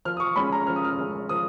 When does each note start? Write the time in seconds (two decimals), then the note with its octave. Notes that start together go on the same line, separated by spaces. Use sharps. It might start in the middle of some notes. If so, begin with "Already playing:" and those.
0.05 F3 F6
0.17 D#6
0.20 C#6
0.36 G#3 C#4 B5
0.52 A#5
0.67 F3 F6
0.76 D#6
0.85 F6
0.99 G#3 C#4
1.29 F3 D#6